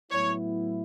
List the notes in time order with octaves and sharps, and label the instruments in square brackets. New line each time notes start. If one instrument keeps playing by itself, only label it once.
[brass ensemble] A2 F#3 B3 E4 [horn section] C#5